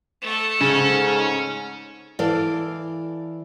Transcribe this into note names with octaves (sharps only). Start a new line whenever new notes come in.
A3 A4
G#2 C#3 C#4
E3 A4 D5 F5